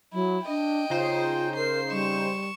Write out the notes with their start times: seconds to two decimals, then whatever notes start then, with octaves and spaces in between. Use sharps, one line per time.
0.13 F#3 E4
0.48 D4 D#5 G5
0.90 C#3 D#4 F4 C5
1.57 A#4 C7
1.91 G3 C#6 E7